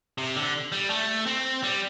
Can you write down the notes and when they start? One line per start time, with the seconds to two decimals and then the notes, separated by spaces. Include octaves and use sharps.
0.18 C3
0.36 D3
0.72 G3
0.90 A3
1.26 C4
1.63 G3